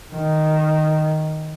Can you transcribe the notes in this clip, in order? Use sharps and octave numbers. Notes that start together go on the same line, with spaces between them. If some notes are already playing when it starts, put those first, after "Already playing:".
D#3